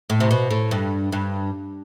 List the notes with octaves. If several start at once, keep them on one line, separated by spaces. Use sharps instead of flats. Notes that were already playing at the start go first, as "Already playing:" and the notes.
A2
C3
B2
A2
G2
G2